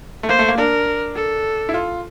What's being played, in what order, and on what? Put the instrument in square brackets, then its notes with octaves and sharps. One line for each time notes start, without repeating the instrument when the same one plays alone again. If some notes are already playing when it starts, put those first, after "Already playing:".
[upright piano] A3
[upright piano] A#3 [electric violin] C5
[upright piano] A3
A#3
[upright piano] D4 [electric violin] A#4
[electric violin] A4
[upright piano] E4
F4